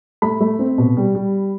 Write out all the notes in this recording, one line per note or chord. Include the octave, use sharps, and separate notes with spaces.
A3 B5
A3
C4
B2
G3
G3